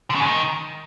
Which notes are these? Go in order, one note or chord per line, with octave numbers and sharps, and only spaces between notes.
D3
C#3
G#2
D#3